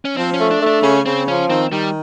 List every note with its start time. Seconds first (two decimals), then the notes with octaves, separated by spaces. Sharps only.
0.05 C#4
0.17 F3 C4
0.34 C#4
0.40 A3
0.51 D4
0.62 A3 D4
0.83 C#3 C#4
1.05 C#3 C4
1.28 F3 C#4
1.50 D#3 C4
1.71 D#3 G3